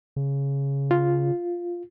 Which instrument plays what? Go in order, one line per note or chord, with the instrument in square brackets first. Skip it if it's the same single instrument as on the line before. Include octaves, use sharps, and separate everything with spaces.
[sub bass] C#3
[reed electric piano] F4